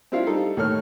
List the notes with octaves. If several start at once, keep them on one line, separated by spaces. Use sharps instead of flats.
C4 D4 E4 F4 F5
G3 D#4 A4
D#2 A2 A4 C#5 F6